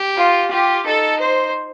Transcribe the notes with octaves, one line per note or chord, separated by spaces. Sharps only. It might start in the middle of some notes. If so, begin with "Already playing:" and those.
Already playing: G4
F4
F4 G4
D#4 A4
C5